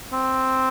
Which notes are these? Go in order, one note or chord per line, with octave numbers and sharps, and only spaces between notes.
C4